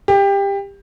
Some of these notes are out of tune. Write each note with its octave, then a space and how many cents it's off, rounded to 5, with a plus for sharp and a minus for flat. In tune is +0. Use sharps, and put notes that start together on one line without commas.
G4 +20